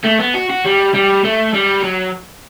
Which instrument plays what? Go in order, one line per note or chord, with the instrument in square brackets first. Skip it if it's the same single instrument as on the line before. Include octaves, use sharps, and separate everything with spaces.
[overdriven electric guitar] A3
B3
F#4
F#4
G3
G3
A3
G3
F#3